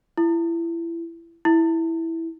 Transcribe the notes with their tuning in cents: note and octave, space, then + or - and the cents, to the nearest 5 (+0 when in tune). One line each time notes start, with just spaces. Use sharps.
E4 +25
E4 -5